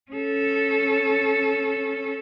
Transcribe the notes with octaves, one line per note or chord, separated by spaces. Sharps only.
C#4 A4